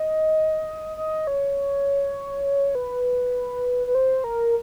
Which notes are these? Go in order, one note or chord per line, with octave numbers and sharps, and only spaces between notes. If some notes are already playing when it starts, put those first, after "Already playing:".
Already playing: D#5
D#5
C#5
B4
B4
C5
A#4